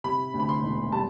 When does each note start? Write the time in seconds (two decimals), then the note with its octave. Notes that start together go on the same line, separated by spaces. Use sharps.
0.04 C3 B5
0.34 D2
0.40 B5
0.49 C6
0.63 E1
0.92 G3 A5